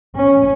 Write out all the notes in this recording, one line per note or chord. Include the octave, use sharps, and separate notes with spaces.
C#4